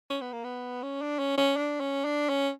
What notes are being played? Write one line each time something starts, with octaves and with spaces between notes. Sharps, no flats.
C#4
B3
A#3
B3
C#4
D4
C#4
C#4
D4
C#4
D4
C#4